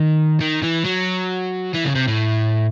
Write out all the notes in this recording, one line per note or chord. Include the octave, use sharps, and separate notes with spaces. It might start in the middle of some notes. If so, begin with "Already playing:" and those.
Already playing: D#3
D#3
E3
F#3
E3
C#3
C3
A2